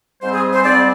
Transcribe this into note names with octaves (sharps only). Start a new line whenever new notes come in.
G#2 G3 C4 C5
G#4
C5
G#2 G3 C4 D5